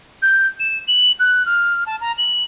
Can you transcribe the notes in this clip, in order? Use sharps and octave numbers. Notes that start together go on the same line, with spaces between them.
G6
E7
F#7
F#6
F6
A5
A#5
F#7